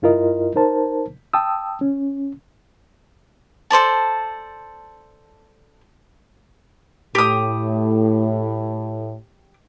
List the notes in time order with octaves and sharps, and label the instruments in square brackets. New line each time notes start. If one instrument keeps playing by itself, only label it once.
[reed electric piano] G2 E4 F4 A#4 D#5
D#4 A#4 C5 A5
G5 A5 D#6 E6
C#4
[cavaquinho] A4 C5 D5 A5
[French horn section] A2 [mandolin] G4 D#6